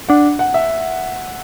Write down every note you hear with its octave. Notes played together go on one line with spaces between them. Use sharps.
D4 F#5
F#5
E5